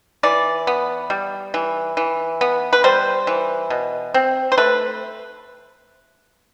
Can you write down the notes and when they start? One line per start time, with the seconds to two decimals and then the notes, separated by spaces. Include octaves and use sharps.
0.23 E3 D5
0.67 B3
1.10 G3
1.54 E3
1.97 E3
2.41 B3
2.73 B4
2.84 G3 C5
3.27 E3
3.70 B2
4.14 C4
4.52 C5
4.58 A3 B4